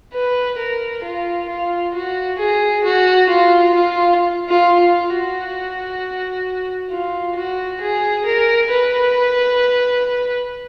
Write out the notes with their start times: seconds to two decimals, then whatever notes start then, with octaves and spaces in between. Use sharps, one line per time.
0.13 B4
0.58 A#4
1.03 F4
1.49 F4
1.94 F#4
2.38 G#4
2.84 F#4
3.29 F4
3.74 F4
4.49 F4
4.79 F4
5.10 F#4
6.90 F4
7.35 F#4
7.80 G#4
8.25 A#4
8.70 B4